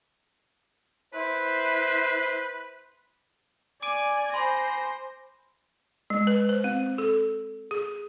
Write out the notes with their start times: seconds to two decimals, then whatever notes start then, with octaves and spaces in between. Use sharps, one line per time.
1.14 E4 B4 C5
3.82 D5 G#5 D6 D7 D#7
4.34 C5 G#5 B5 C6 A#6
6.10 G#3
6.27 B4
6.49 C5
6.64 C4
6.98 A4
7.71 G#4